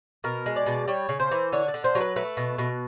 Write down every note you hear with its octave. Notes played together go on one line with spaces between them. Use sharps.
B2 A#4
G#3
D5
B2
G3 C#5
C#3
C5
E3
D3 C#5
D5
D3
C5
F#3
B4
A3 B4
B2
B2